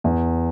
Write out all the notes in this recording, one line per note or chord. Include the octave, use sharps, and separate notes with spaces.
E2